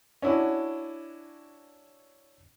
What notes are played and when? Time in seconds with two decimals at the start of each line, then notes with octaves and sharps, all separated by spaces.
0.22 C#4 D4 E4 F#4